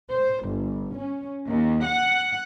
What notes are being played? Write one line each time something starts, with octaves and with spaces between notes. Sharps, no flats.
C5
G1
C#4
D#2
F#5